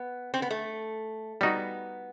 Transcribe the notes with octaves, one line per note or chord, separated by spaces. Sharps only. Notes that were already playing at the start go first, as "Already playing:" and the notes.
Already playing: B3
C4
B3
A3
G3 B3 D#4 F#4